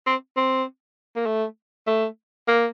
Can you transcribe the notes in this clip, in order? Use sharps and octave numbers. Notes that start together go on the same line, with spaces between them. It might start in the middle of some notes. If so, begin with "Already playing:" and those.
C4
C4
A#3
A3
A3
A#3